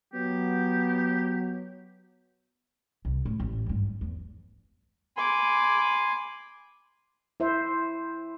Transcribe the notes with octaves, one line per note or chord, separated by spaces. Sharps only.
F#3 B3 G4
C2
A2
A1
G#1 G2
E2
G#5 B5 C6 D6
E4 C5 E5